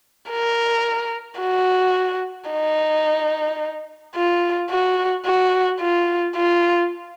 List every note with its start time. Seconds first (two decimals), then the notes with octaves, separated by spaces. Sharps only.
0.31 A#4
1.40 F#4
2.50 D#4
4.16 F4
4.70 F#4
5.26 F#4
5.80 F4
6.36 F4